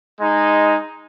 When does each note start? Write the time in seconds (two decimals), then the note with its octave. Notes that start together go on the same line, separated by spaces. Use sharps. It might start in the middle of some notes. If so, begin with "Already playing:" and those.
0.20 G#3 D#4